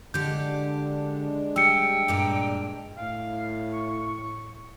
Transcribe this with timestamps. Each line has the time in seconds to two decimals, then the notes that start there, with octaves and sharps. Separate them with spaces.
0.14 D3 G#3 D4 G4 G6
1.56 G3 G5 E6 C#7
2.08 G2 A#2 A#4
2.97 A2 F5
3.73 C#6